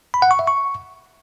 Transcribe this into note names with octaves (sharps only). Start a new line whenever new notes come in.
B5
F#5
C#6
E5
C#6